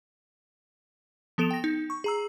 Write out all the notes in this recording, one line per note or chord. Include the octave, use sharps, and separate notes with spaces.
F3 B3 A4 D7 E7 F7
G5 A#6
D#4
C#6
G#4 A#5 E6